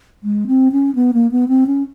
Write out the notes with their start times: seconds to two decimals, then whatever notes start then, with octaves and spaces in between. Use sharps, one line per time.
0.23 G#3
0.47 C4
0.72 C#4
0.95 B3
1.14 A#3
1.32 B3
1.48 C4
1.67 C#4